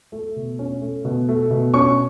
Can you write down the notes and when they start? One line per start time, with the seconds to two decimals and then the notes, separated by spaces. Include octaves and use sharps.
0.12 A3
0.36 B2
0.59 C#4
0.81 A3
1.05 B2
1.29 A3
1.51 B2
1.74 C#4 C#6